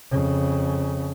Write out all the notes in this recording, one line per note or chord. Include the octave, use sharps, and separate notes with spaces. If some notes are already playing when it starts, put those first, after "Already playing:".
F2 C#3